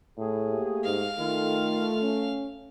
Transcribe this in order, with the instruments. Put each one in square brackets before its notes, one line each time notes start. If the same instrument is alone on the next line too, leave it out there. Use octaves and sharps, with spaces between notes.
[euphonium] A2 [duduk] G#4
[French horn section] A3 A#3 G4
[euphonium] G#2 [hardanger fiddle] F5
[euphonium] D#3 [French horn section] A3 [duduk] F4
[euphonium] C#4